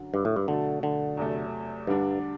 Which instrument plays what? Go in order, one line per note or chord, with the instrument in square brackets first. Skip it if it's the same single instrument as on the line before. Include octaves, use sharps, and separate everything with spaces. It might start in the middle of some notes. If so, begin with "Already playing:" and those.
Already playing: [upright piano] F#2 D3 F#3
[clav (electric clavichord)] G2
A2
G2
[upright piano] B2 F#3 A3 [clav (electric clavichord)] D3
[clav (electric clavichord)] D3
[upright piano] E2 C3 F#3 A3
[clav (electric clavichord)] G2 [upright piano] D3 G3 D4